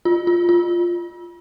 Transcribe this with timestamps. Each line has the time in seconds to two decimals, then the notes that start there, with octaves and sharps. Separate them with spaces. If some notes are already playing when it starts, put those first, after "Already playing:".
0.05 F4
0.27 F4
0.49 F4